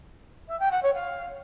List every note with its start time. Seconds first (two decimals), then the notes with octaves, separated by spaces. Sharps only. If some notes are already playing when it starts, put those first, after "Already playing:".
0.48 E5
0.59 G5
0.71 F#5
0.83 C#5
0.94 F5